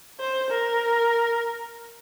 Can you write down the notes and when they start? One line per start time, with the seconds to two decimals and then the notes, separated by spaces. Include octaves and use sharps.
0.20 C5
0.51 A#4